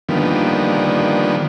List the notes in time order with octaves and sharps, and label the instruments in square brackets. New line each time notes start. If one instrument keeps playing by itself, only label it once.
[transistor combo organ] D3 D#3 F3 G3 A#3 B3